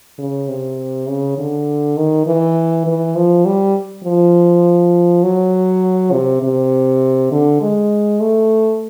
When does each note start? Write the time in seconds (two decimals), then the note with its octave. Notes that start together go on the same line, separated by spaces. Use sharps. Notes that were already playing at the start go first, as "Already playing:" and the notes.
0.18 C#3
0.49 C3
1.08 C#3
1.38 D3
1.97 D#3
2.27 E3
2.87 E3
3.16 F3
3.45 G3
4.04 F3
5.23 F#3
6.12 C3
6.42 C3
7.32 D3
7.61 G#3
8.20 A3